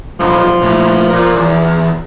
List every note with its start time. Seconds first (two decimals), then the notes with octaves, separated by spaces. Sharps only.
0.20 B1 F2 F3
0.61 A#2 A3
1.10 A#4 D5
1.35 E2